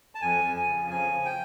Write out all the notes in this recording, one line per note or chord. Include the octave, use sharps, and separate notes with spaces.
A5
F2 G#5
F2
G#5
C#3
F3 G#5
F3
G5